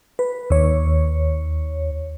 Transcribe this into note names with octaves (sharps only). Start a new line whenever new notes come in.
B4
D#2 C#5